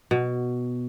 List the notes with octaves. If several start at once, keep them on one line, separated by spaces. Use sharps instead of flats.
B2